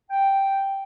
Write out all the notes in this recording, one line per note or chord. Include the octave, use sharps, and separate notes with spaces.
G5